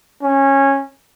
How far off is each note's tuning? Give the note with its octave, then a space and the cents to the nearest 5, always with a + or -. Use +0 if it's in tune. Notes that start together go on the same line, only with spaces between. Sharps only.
C#4 -15